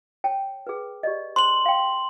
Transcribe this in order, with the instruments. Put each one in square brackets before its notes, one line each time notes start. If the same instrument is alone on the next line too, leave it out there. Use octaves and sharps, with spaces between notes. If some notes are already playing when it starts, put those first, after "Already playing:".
[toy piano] C#5 G5 A5
G#4 B4
G4 D5 D#5
[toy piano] C5 [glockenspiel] C6 F#7
[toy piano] F5 G5